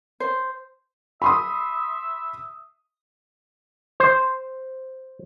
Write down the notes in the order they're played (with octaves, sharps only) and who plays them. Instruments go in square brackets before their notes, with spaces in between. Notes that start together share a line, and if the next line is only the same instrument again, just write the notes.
[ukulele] C5
[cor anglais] E5 [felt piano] B5 C6 D#6
[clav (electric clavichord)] C5